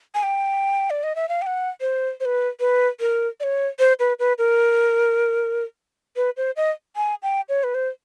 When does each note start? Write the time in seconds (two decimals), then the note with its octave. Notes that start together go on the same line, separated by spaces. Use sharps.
0.15 G#5
0.23 G5
0.90 D5
1.03 D#5
1.16 E5
1.29 F5
1.42 G5
1.46 F#5
1.81 C5
2.20 C5
2.25 B4
2.60 B4
3.00 A#4
3.40 D5
3.43 C#5
3.79 C5
4.00 B4
4.19 B4
4.38 A#4
6.16 B4
6.37 C5
6.57 D#5
6.96 G#5
7.23 G5
7.49 C#5
7.64 B4
7.75 C5